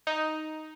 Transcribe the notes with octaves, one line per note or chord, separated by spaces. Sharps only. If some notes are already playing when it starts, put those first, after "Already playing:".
D#4